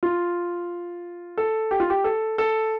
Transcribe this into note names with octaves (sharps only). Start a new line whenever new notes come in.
F4
A4
G4
F4
G4
A4
A4